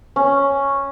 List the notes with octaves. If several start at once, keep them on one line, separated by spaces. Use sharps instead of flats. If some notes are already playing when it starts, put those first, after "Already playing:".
C#4